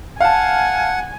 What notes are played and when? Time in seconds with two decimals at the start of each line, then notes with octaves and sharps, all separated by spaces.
0.21 F5 F#5 G#5 A5